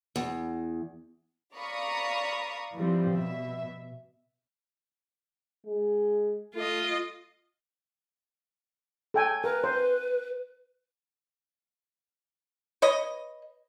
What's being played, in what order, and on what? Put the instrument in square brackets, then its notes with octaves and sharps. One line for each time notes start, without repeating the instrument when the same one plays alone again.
[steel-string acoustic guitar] E2
[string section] D5 F5 A#5 B5 C#6 D#6
E3 F3 G3 C4
B2 E5
[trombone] G#3
[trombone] A3 [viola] F4 D#5
[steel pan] A4 G5 G#5
[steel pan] A#4 [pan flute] B4
[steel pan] C5
[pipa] B4 C#5 D#5